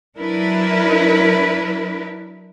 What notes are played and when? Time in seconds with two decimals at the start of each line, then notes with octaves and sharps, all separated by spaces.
0.17 F#3 D4 E4 A#4 B4